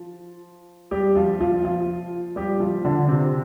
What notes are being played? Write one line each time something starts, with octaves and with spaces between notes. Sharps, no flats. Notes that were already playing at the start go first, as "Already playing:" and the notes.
Already playing: F3
G3 G4
F3 F4
F3 F4
F3 F4
G3 G4
F3 F4
D3 D4
C3 C4